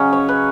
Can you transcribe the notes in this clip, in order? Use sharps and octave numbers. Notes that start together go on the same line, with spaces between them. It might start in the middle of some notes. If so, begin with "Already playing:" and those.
Already playing: C#3 F#3 C#4 D#5
C#5
B4